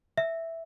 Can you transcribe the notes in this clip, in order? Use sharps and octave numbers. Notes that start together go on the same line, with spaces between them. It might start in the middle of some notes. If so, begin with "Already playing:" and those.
E5